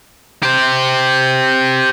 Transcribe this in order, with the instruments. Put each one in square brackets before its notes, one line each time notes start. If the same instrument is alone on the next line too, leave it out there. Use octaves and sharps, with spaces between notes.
[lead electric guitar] G4 C5